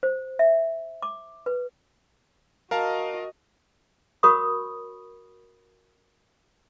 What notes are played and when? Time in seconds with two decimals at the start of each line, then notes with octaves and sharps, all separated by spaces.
0.03 C5
0.39 E5
1.02 D6
1.46 B4
2.71 F#4 A#4 D#5 F5 A5
4.23 F#4 A#4 C#5 B5 C#6 D#6